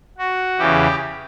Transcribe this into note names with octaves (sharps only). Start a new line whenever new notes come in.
F#4
E2 C#3 E3 G4